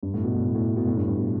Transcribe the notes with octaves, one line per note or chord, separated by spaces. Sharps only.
G2
A2
B2
A2
A2
A2
B2
A2
G2
G2
B2